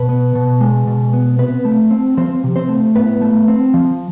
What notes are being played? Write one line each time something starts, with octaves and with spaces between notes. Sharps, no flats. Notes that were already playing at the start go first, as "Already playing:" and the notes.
Already playing: B2 B4
B3
B2
G#3
B2
B3
C3 B3 B4
A3
C4
F3 C4 C5
C3
C4 C5
A3
A2 B3 B4
A3
C4
F3